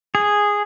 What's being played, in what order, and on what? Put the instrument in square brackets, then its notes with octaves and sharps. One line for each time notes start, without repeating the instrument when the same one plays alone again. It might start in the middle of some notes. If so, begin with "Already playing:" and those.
[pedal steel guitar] G#4